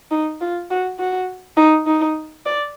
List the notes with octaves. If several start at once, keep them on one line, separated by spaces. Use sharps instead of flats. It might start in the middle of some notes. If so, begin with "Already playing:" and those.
D#4
F4
F#4
F#4
D#4
D#4
D5